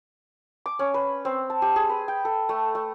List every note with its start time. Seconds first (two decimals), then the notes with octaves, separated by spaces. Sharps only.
0.66 D6
0.79 C#4
0.94 B4
1.25 C4
1.50 A5
1.62 G4
1.76 G#4
1.89 B4
2.08 G5
2.25 A4
2.49 A3
2.75 A3